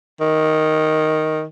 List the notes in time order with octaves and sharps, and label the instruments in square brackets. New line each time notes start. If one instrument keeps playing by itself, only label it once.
[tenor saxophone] D#3